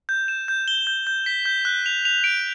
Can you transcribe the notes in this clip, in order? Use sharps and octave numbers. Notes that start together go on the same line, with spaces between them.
G6
E7
G6
G7
G6
G6
B6
G6
F#6
F7
F7
D7